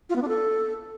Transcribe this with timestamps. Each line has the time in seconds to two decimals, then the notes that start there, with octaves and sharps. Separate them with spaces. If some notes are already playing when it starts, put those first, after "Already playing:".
0.10 F4
0.16 B3
0.22 D4
0.28 A4